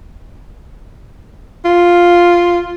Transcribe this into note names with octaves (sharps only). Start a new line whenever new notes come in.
F4